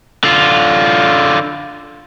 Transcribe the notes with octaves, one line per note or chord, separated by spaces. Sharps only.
D3 F4